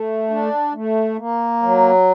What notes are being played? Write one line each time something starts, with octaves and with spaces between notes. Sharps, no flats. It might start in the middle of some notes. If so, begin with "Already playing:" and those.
Already playing: A3
D4
A3
A#3
F#3